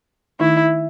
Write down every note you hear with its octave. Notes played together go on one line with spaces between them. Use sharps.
D#3 A3 D#4 E4